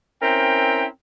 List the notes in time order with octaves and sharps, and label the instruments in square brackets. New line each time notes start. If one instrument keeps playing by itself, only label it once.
[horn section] C4 C#4 E4 A#4 G5